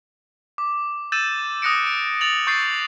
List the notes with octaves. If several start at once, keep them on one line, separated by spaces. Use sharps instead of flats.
D6
E6 G6 A6 D#7 E7
D#6 F#6 A#6 C#7 D7
D7
A6 F7 F#7
C#6 G6 A6 C7